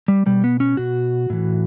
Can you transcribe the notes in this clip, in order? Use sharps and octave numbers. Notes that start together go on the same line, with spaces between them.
G3
B2 G3
B3
C#4
B2 F#4
A2 E3